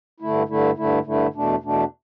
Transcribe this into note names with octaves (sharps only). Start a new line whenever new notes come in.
G2 D3 A3 E4
G2 D3 A3 E4
G2 D3 A3 E4
G2 D3 A3 E4
E2 B2 A3 D4
E2 B2 A3 D4